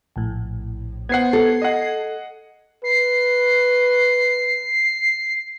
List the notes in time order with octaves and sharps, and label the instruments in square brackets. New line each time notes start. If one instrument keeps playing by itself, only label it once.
[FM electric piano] A#1 A2
[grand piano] B3 C5 F#5 [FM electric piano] G#6 C7
[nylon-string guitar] A4
[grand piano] D#5 F#5
[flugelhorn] B4 [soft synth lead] C7